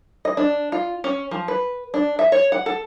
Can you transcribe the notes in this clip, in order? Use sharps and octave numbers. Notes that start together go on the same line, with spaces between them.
D#5
D4
F4
C#4
F3
B4
D4
E5
C#5
F#5
A4